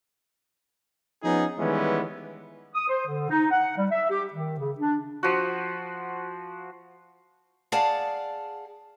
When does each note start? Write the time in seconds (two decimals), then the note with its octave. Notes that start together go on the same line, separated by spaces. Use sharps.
1.23 F3 B3 C#4 D#4 G#4
1.59 D#3 E3 G3 G#3 B3 C#4
2.75 D#6
2.89 C5
3.07 D3
3.30 D#4
3.51 F#5
3.77 G3
3.91 E5
4.11 G4
4.33 D#3
4.59 C#3
4.79 D4
5.23 F3 F#4
7.72 G#4 D5 F5 F#5 A5